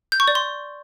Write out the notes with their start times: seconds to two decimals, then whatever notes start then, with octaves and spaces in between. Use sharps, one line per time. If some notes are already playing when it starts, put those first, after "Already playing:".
0.12 G6
0.20 C#6
0.28 D5
0.35 C6